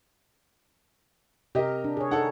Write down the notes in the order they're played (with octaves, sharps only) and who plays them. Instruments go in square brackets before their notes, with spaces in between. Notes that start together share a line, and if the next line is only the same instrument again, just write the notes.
[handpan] C3 A#4 [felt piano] G4 D#5
[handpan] D4
G#4 C#5
[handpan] D#4 [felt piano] A4 F#5